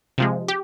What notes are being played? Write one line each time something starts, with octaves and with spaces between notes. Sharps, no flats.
C3 F3 G#3
G4